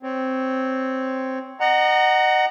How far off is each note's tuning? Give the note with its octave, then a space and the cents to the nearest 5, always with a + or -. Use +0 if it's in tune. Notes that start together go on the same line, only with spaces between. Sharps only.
C4 +0 C#5 +0
D#5 -30 F#5 +15 A#5 -5